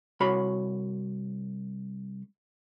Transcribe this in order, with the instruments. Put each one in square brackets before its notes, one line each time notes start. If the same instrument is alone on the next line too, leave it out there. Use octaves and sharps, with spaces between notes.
[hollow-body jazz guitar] C2 F#4 C#5 B5